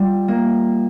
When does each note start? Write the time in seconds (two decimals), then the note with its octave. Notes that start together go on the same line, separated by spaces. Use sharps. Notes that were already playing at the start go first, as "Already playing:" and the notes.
Already playing: G3 F4
0.28 A#3